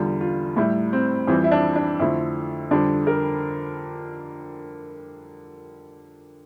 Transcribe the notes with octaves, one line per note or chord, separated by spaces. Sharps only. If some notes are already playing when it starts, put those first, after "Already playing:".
Already playing: E2 D3 G3 F4
F4
A2 G3 E4
C4
F2 E3 G3 C4
E4
D4
D4
F2 D3 A3 E4
F2 D3 G3 D4
A#4